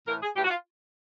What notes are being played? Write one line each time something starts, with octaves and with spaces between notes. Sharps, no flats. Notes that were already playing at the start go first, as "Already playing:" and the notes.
A2 E3 A#4
G#4
A2 E3 G4
F#4
F4